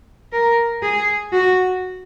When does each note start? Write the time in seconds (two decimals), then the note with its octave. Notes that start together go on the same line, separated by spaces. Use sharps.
0.32 A#4
0.82 G#4
1.32 F#4